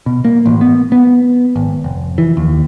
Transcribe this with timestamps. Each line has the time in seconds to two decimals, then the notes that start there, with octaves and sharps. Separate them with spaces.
0.06 B2
0.25 A#3
0.46 A1
0.61 B3
0.92 B3
1.56 G#1
1.84 F1
2.18 E3
2.37 D#2